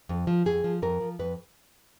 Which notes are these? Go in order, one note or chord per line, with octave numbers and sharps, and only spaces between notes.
F2
F3
F2 G#4
F3
F2 A#4
F3
F2 B4